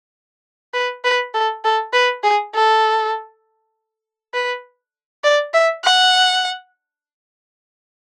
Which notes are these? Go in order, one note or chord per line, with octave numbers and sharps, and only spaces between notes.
B4
B4
A4
A4
B4
G#4
A4
B4
D5
E5
F#5